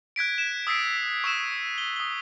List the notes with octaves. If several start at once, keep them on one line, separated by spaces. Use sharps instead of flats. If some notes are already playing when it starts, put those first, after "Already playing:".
F#6 G#6 B6 D7
E7
D#6 E6 A6 B6 C7 D7
C#6 E6 E7
G7
D#6 G7